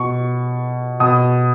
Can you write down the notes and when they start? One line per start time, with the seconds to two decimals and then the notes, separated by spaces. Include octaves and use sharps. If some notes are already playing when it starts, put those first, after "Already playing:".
Already playing: B2 C#6
1.00 B2 D#6